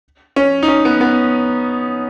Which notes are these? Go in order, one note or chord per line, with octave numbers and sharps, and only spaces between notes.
C#4
D#4
C#4
B3
B3